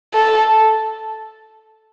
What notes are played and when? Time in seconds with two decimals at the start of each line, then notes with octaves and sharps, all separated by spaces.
0.15 A4